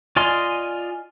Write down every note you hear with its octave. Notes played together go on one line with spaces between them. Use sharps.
F4 D5 D#5 G#5 C6